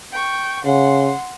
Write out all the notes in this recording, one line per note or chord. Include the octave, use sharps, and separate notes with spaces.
G5 C#6
C#3 F#5 C6